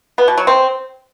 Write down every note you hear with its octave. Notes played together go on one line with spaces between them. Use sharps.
B3
B2
F#3
C4